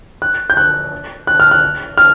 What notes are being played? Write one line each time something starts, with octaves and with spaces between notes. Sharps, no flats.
F#6
G6
F#6
F#6
F6
F#6
F6